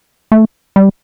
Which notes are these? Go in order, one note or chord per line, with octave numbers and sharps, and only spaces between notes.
A3
G3